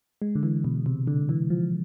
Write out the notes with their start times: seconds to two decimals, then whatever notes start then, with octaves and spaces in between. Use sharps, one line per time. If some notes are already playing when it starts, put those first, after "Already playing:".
0.22 G#3
0.35 D3
0.43 E3
0.64 B2
0.86 C3
1.07 D3
1.29 E3
1.50 F3